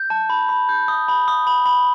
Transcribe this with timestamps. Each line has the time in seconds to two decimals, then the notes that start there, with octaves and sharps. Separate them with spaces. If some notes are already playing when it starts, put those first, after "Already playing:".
Already playing: G6
0.10 A5
0.30 B5
0.49 B5
0.69 G6
0.88 D#6
1.08 B5
1.28 D#6
1.47 B5
1.66 B5